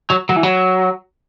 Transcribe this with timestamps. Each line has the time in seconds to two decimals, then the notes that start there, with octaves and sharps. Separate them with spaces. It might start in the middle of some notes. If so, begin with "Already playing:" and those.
0.10 F#3
0.29 F#3
0.36 E3
0.43 F#3